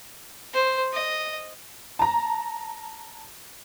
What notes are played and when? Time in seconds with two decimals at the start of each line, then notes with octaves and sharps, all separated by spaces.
0.53 C5
0.93 D#5
1.99 A5 A#5